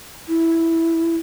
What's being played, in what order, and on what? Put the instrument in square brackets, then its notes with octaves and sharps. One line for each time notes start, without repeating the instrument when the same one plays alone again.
[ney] E4